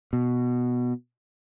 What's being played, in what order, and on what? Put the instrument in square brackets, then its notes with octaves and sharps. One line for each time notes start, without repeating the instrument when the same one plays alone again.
[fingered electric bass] B2